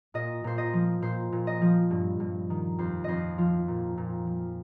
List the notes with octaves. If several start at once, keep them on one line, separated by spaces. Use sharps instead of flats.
A#2 D#5
A#2 C5
D#5
F3
A#2 C5
A#2
D#5
F3
G2
G2
D#3
F2 C5
F2 C5 D#5
F3 F4
A#2
A#2
F3